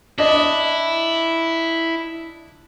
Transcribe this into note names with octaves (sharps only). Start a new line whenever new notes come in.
D4 E4 D#5